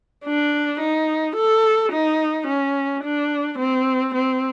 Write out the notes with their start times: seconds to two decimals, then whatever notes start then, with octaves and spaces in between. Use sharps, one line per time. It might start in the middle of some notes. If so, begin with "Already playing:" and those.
0.25 D4
0.80 D#4
1.36 A4
1.92 D#4
2.47 C#4
3.04 D4
3.59 C4
4.15 C4